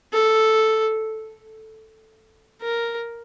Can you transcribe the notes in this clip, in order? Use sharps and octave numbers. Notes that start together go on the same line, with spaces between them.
A4
A#4